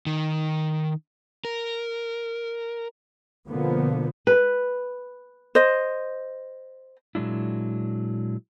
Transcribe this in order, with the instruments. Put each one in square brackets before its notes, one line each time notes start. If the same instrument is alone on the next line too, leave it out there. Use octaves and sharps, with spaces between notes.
[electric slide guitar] D#3
A#4
[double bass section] B2 D3 F3 A#3 B3
[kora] B4
[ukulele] C5 D#5
[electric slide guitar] A#2 F#3 G#3 D4 E4